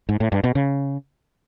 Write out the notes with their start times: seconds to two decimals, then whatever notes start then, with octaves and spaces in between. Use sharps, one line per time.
0.09 G#2
0.20 A2
0.32 G2
0.44 B2
0.55 C#3